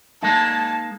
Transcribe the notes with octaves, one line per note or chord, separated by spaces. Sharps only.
G#3 A#3 D#4 A5